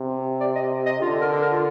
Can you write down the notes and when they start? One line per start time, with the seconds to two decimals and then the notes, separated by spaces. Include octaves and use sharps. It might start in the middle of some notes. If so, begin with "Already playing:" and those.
Already playing: C3
0.41 D5
0.55 D#5
0.86 D#5
1.01 D3 F4
1.21 A#4
1.42 A#4
1.53 F4